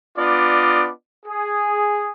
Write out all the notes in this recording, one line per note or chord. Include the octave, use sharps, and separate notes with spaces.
B3 D4 F4 D5 D#5
G#4